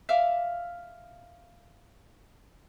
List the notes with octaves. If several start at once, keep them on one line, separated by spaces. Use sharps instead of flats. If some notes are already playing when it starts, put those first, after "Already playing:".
E5 F5 D6 F6